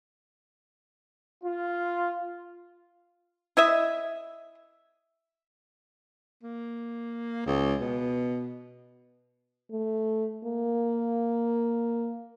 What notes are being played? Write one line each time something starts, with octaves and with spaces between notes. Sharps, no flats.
F4
E4 D#5 E5
A#3
C#2
B2
A3
A#3